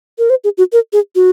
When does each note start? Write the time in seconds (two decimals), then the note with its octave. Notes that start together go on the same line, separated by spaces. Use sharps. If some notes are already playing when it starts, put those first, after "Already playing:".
0.18 A#4
0.30 C5
0.44 G#4
0.58 F#4
0.73 A#4
0.93 G#4
1.15 F#4